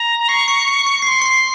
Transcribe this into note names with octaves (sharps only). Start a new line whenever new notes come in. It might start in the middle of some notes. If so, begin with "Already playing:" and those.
Already playing: A#5
C#6 C7
C#7
C#7
C#7
C7
C6 C#7
C#7
C7